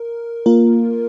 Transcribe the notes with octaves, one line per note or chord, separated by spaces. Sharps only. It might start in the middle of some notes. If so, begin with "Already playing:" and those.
Already playing: A#4
A#3 F4 A#4